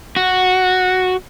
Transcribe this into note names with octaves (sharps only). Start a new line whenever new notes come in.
F#4